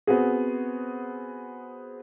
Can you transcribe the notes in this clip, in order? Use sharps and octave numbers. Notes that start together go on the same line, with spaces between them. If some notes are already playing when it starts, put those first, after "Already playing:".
B3 C4 F#4 G#4